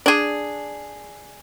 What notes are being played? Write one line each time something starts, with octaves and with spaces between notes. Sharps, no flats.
D4 G#4